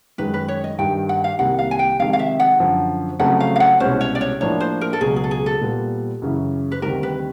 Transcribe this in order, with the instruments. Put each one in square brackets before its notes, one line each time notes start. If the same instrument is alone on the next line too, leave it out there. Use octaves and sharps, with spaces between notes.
[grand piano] F#2 D#3 G#3 [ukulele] B4
[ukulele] B4
C#5
D#5
[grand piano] G2 D#3 G3 [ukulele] G5
[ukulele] F#5
F5
[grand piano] C2 C3 D#3 G3 A#3 [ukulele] F#5
[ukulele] F5
G#5
G5
[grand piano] F2 C3 D#3 G#3 [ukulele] F5
[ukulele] F5
E5
F#5
[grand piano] F#2 D3 F3
[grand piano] F2 C#3 F#3 A3 C4 [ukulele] F#5
[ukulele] F5
F5
F#5
[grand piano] C2 B2 G#3 C#4 [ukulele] C5
[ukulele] C#5
D5
C#5
[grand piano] A2 F3 A#3 D4 [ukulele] C#5
[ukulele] C5
A#4
A4
[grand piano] C#2 B2 F#3 [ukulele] G#4
[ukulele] G#4
A4
G#4
A4
[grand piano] A#2 G3 B3
F#2 C#3 E3
[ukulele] B4
[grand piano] D2 C3 D#3 G3 [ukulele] A#4
[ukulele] B4